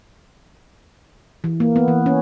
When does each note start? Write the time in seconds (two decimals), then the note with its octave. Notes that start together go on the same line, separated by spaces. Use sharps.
1.44 E3
1.60 A#3
1.76 B3
1.88 E3
2.06 C#4